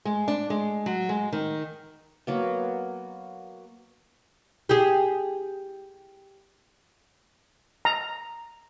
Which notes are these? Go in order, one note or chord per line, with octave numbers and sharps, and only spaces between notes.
G#3
D4
G#3
F#3
G#3
D#3
F#3 A#3 B3
G4 G#4
A#5